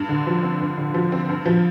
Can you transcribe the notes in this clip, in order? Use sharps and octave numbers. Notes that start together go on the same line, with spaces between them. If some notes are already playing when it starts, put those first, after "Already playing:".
Already playing: G2
D3
F3
C4
G2
D3
F3
C4
G2
F3